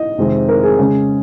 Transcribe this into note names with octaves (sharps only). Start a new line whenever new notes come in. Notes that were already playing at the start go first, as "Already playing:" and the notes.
Already playing: D#5
F2 C3 D#3 G#3 C4
A#4
G#4
C#3 G#3 C#4